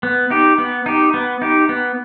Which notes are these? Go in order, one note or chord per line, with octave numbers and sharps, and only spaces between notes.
B3
D#4 G4
B3
D#4 G4
B3
D#4 G4
B3